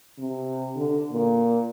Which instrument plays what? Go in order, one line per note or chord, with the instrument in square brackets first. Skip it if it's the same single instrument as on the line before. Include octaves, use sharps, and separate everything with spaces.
[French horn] C3
D3
A#2